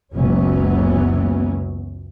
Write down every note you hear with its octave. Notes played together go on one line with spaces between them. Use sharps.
F#1 C#2 E3 F#3 B3 C#4